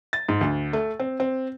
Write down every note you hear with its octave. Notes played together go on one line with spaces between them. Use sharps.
A6
G#2
D2
A3
C4
C4